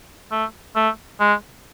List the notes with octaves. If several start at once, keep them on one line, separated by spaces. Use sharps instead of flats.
A3
A3
G#3